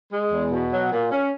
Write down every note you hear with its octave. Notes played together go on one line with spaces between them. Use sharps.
G#3
E2
B2
F#3
A#2
C#4